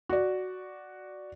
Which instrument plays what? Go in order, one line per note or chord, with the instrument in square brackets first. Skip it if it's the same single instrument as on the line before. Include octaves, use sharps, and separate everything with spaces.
[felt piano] F#4 D5